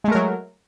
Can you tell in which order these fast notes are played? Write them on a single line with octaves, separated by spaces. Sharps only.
G#3 A3 A#4 F#3